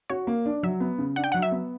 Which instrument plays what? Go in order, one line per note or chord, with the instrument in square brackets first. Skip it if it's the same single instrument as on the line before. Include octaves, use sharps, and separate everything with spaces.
[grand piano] F#4 [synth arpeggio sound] C#5
[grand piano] A#3
D4
[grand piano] F#3 [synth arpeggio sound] E5
[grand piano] B3
C#3
[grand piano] D4 [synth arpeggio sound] F#5
[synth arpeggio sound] G5
[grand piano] F#3 [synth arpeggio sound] F#5
[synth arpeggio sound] E5
[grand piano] B3